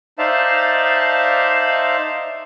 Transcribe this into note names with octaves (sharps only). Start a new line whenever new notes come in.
D#4 C5 D5 E5 F5 A5